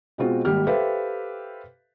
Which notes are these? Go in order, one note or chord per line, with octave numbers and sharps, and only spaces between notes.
B2 G#3 C4 F4 F#4
G#1 G3 A#3 G4 F6
G4 A4 B4 C5 E5 F5